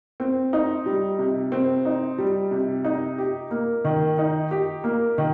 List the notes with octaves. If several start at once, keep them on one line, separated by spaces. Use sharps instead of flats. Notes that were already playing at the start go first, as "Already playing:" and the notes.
C4
D#4
G3
C3
C4
D#4
G3
C3
D#4
G4
A#3
D#3
D#4
G4
A#3
D#3